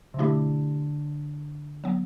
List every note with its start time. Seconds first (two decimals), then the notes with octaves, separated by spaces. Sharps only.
0.14 C3
0.18 B2 D3 A3 E4 G4
1.84 F#3 B3